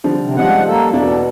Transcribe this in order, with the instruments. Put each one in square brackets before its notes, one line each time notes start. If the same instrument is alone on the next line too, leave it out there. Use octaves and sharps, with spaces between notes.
[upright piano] D3 F3 G3
[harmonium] C3
[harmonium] G#2 F3 F#5 [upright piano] G3 C#4 D#4
[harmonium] A#3 A4
[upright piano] E2 D4 E4 [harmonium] B2